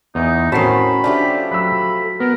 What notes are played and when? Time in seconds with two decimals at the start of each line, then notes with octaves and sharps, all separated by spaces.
0.15 E2 D#4
0.52 A2 D#3 C4 C#4 F#4 A5 B5 C7
1.04 F3 A3 D4 G4
1.51 F#3 B5 E6
2.20 B3 A#4